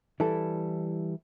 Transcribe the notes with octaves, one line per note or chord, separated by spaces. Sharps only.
E3 G3 E4 A4